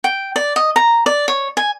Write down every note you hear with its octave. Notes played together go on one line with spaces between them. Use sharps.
G5
D5
D#5
A#5
D5
C#5
G#5